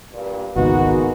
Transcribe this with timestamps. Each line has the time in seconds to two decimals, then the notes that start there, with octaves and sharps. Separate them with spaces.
0.12 G2 A#2
0.56 G#1 C#2 G#3 A#3 B3 D#4 F#4